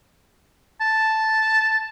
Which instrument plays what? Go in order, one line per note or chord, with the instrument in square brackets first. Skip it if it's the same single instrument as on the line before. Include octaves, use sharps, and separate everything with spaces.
[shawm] A5